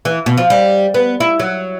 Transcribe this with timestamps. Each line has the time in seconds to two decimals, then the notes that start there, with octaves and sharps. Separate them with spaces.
0.05 E3
0.26 B2
0.38 F3
0.50 G3
0.94 B3
1.20 E4
1.40 F#3